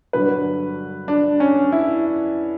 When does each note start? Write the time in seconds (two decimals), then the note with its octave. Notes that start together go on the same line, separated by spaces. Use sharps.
0.13 G2 D3 F#3 B4
1.08 D4
1.40 C#4
1.72 E4